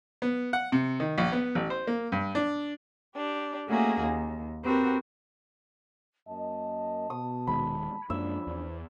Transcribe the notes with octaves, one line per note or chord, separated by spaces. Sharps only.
B3
F#5
C3
D#3
A#1
B3
A1
C5
A#3
G2
D4
D4 G4
A3 A#3 C#4 F#4 G#4
D#2
C4 F#4 G4 A#4 B4
F#2 A#3 D#5 A5
B2 D#6
D#1 D#3 G#3 B5
F#2 F3 G#3 A#3 C#4 D4 E5
E2 C5